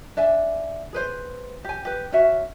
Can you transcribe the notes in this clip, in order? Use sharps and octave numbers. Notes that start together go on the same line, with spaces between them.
D4 E5 G#5
G#4 B4 C5
G4 G#5
G4 B4
C#4 F#4 E5